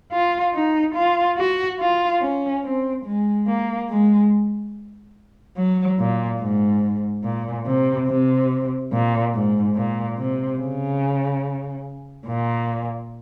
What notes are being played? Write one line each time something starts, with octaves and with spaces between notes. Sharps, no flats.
F4
D#4
F4
F#4
F4
C#4
C4
G#3
A#3
G#3
F#3
A#2
G#2
A#2
C3
C3
A#2
G#2
A#2
C3
C#3
A#2